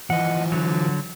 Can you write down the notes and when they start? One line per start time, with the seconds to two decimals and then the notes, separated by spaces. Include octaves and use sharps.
0.10 E3 F3 D#5 F#5
0.52 D3 F#3